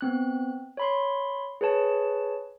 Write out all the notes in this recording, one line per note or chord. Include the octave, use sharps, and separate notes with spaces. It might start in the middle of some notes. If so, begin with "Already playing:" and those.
B3 C4 F#6
C#5 B5 C6
G#4 B4 C#5 A5